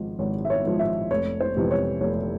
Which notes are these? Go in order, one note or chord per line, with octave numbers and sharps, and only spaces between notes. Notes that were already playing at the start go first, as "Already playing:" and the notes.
Already playing: G#1 G#2 F3
G#1 C#5
E5
C#5
G#2 F3
E5
F1 C#5
C5
F2 C3 E3
C#5
F1 C#5